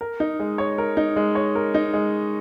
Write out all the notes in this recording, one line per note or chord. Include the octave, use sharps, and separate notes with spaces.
A#4
D#4
G#3
C#5
A#4
D#4
G#3
C#5
A#4
D#4
G#3